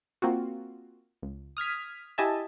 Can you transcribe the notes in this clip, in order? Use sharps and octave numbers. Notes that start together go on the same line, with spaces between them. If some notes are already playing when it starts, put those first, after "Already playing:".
A#3 C4 F4 F#4
C#2
D#6 F6 G#6 B6
E4 G4 D#5 E5 G#5 A5